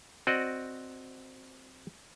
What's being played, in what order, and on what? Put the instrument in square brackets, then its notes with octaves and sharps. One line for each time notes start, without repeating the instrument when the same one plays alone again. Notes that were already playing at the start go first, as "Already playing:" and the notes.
[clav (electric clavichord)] C4 F#4 D5 D#5